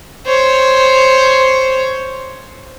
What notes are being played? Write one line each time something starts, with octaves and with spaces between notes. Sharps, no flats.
C5 C#5